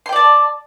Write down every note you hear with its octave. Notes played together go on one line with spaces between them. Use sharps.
D5 G5 A5 C6